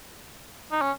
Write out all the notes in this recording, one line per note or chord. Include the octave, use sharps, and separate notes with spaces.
D#4
C#4